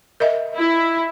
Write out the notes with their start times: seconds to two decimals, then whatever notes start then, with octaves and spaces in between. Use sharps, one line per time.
0.20 A#4 D#5 E5
0.55 E4